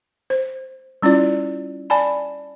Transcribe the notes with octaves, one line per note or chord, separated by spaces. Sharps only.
C5
G3 C#4 E4 F4 D5
D5 G#5 A5 B5